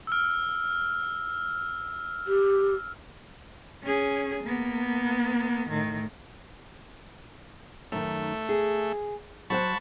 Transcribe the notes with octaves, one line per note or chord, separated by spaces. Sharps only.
E6 F6
G4
C#4 G#4
A#3 B3
A2 D#3
F#2 D#3 A3
G#4
F#3 C5 F#5 A5 B5 C#6